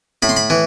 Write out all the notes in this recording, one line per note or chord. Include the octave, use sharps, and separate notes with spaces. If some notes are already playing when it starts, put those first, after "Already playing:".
A2 B5
C6
B5
E3